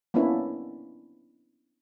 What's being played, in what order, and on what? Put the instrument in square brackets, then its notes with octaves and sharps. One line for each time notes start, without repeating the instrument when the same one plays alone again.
[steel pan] A#3 B3 C#4 D4 E4